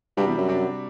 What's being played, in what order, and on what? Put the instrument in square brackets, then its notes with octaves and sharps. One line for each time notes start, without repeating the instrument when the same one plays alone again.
[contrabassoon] G2 [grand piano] C3 G3 D4 F#4
[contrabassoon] E2
F#2
[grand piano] C3 G3 D4 F#4